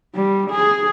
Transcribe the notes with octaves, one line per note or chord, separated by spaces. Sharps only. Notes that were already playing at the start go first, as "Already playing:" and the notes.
G3
G#4